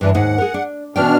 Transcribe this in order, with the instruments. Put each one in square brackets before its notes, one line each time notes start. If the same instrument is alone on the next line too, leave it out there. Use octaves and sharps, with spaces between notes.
[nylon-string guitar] G2 E3 [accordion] D4 B4
[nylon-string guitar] D#2 G#2 D#4 [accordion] F#5
[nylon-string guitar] G#4 A#4
D4
[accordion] B2 D4 F6 [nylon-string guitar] E3 C#4 G5